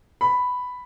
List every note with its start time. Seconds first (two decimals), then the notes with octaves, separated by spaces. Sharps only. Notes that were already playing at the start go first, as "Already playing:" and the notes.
0.21 B5